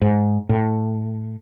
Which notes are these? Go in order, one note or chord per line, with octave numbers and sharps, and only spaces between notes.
G#2
A2